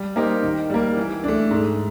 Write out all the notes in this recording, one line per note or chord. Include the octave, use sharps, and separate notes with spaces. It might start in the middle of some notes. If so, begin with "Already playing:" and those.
Already playing: G3
A#3 D#4 G4 C5
D#3
G3 A#3
E3
A3 D4
G#2